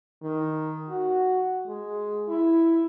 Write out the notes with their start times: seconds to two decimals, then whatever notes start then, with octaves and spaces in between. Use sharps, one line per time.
0.23 D#3
0.89 F#4
1.66 G#3
2.28 E4